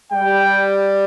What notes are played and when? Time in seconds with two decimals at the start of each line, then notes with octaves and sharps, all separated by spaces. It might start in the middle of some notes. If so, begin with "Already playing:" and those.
0.12 G3 G5